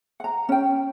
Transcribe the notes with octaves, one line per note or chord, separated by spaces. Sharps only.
F#5 A#5
C#4 G5